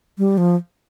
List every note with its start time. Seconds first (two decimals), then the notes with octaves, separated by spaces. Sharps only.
0.18 G3
0.38 F3